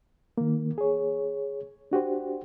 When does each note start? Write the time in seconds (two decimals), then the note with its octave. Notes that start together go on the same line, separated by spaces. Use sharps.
0.38 D#3 A#3
0.78 G#4 C#5
1.92 D4 F#4 G4 C5